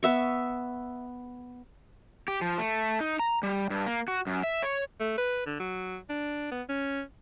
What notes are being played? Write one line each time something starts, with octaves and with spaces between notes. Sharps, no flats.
B3 E5 C#6
G4
F3
A3
D#4
A#5
G3
G2
A#3
F#4
F#2
E5
C#5
A3
B4
D3
F#3
D4
B3
C#4